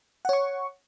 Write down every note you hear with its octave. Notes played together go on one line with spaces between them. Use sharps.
C#5 F#5 C#6